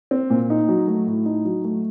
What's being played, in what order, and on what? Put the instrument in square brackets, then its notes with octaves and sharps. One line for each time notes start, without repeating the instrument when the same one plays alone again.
[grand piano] C4
A#2
D#4
F#3
A3
A2
D#4
F#3
A3